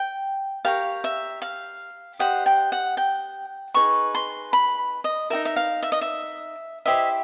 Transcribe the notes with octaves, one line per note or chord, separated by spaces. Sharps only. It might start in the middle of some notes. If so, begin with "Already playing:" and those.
Already playing: G5
G4 A#4 C#5 F5
E5
F5
G4 C5 D#5 F#5
G5
F#5
G5
D#4 G#4 B4 C#6
C6
B5
D#5
D#4 F#4 A#4 E5
E5
F5
E5
D#5
E5
E4 G4 C5 D#5 E5